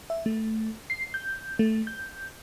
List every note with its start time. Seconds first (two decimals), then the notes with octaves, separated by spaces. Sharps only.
0.10 E5
0.26 A3
0.90 C7
1.14 G6
1.59 A3
1.87 G6